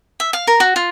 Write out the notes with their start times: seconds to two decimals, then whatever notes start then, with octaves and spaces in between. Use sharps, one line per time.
0.20 E5
0.33 F5
0.47 A#4
0.60 F#4
0.76 F4